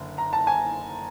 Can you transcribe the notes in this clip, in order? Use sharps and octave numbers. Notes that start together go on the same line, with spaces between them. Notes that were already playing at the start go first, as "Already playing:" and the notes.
Already playing: F#1 D3
A#5
A5
G#5